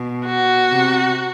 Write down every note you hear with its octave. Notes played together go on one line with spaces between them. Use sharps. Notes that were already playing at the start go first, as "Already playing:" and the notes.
Already playing: B2
F#4
C3